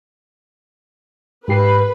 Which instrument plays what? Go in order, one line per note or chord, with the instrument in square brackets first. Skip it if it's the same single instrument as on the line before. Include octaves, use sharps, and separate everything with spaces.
[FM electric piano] G#2 G4 C7 [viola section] B4